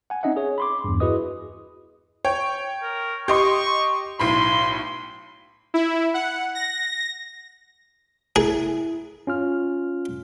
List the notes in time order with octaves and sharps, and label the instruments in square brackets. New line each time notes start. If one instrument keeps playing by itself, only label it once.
[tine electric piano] F#5 G#5
C4 C#4 D#4 D#5 E5 F#5
G#4 C#5
B5 C6 D6
E2 G2
E4 F#4 G#4 B4 D#5 D#6
[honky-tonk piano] C#5 G5
[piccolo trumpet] A#4
[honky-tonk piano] G4 D#5 C6 [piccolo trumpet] C#6
[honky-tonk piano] B1 A2 B5 [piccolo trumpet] C6
[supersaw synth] E4
F#5
A#6
[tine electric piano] E4 [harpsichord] G#4
[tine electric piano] C#4 F4 F6